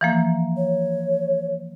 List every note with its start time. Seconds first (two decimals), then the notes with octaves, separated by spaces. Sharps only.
0.01 E3 F3 A#3
0.57 C#5